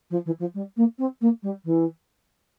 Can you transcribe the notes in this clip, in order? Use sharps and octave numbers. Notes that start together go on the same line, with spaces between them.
F3
E3
F3
G3
A#3
C4
A#3
G3
E3